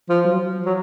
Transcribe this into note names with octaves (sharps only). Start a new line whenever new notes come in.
F3
F#3
F#3